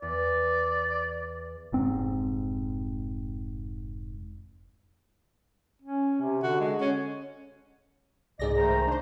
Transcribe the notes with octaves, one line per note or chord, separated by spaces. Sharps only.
E2 D5
F1 G#2 C4
C#4
C3
D3 F#4
G#3
C#4
C2 G#2 G#4 D5 D#5 A#6
D#3 A3 C5 A#5
D4 C5